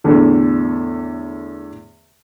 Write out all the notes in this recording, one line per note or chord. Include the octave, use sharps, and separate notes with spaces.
E2 A2 D3